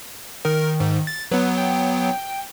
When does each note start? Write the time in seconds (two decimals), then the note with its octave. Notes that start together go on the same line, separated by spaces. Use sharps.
0.45 D#3 A#4
0.80 G#2
1.07 A6
1.31 F#3 B3 B4
1.57 G5